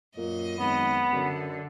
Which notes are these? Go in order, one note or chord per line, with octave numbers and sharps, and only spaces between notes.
F#2 A#2 D#5
G#1 B3
F#2 D3